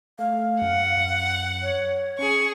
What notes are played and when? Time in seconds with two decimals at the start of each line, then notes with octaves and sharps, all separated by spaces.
0.19 A3 F5
0.62 F#2 F#5
0.97 F#2
1.62 C#5
2.19 C#4 G#4 C#6